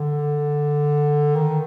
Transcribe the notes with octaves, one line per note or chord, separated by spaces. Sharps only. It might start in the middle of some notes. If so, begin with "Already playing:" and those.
Already playing: D3
D#3